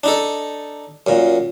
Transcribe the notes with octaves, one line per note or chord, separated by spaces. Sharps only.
D4 D#4 A4
F#2 A#2